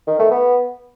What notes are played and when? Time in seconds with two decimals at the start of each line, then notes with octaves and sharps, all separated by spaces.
0.07 D#3
0.19 A3
0.31 B3